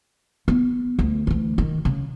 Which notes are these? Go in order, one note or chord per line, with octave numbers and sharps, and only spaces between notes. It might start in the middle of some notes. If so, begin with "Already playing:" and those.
B3
D2
D2 E3
D#3
C#3